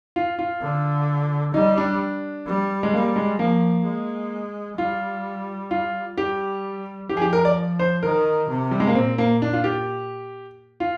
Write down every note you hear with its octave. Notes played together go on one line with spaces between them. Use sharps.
F4
F4
D3
G3 D#4
D4
G3
G#3
G3 A#3
G#3
F3 A#3
G#3
G3 F4
F4
G3 G4
F3 G4
G#4
G4
A#4
D5
C5
D#3 A#4
C3
G3
G#3
A#3
A#2 C4
A#3
D4
F4
G4
F4